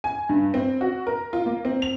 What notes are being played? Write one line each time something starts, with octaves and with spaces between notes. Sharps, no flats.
G#5
G2
C4
F#4
A#4
F4
A#3
C4
F7